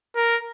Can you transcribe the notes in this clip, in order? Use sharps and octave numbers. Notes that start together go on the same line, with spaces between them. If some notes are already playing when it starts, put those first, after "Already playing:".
A#4